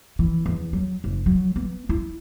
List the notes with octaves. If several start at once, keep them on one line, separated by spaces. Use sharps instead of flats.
E3
E2
F#3
F#1
F#3
B3
E4